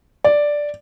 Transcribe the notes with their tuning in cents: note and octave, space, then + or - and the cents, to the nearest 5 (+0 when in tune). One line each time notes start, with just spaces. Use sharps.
D5 +0